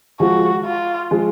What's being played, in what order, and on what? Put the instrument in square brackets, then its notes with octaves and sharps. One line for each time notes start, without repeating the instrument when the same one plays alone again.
[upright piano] F3 G#3 [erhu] F#4
[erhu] F4
[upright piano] F3 G#3